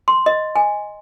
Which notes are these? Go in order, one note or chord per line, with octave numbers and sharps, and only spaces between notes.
C6
D#5
G#5